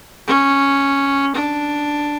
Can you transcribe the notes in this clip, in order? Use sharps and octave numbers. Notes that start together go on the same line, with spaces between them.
C#4
D4